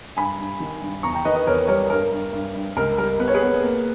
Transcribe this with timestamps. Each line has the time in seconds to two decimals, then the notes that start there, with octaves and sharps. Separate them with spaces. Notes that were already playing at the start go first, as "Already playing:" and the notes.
0.17 G2 G#5 B5
0.38 G2
0.60 D#3
0.81 G2
1.03 E2 A#5 C#6
1.14 G5 A#5
1.25 D#3 B4 D#5
1.36 B4 D#5
1.47 E2 A#4 C#5
1.68 G3 A#4 C#5
1.90 G2 A#4
2.12 G2
2.33 G2
2.55 G2
2.77 C#2 A#4
2.98 G3 A#4
3.20 B3 B4
3.28 C#5
3.34 G#4 B4
3.42 B3
3.63 A#3